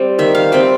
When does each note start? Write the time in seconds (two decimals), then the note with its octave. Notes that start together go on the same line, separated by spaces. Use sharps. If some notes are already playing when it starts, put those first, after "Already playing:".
Already playing: G3 C4
0.19 D#3 E5
0.35 F5
0.52 G3 C4 E5